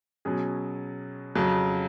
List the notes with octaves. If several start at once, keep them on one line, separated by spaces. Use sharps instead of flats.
B2 F#3 C#4 G#4
F2 C#3 F#3